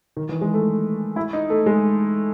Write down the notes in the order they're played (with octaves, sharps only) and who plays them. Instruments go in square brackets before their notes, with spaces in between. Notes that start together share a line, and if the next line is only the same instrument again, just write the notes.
[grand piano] D#3
E3
G#3
A3
E4
D#4
A3
G#3